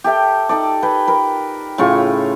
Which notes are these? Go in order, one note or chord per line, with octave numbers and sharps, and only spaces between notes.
G4 A4 E5 G5
D#4 A4 D5
B4 G5 G#5
A#4 B4
A2 C#3 F4 C#6